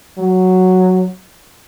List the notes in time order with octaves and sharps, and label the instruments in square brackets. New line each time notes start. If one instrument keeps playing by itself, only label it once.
[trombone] F#3